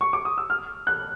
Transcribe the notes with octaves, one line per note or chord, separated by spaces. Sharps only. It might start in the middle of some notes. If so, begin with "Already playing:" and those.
C#6
D6
D#6
E6
F6
F#6